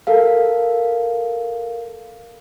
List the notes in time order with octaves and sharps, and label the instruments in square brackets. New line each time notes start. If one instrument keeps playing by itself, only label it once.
[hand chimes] A4 A#4 F5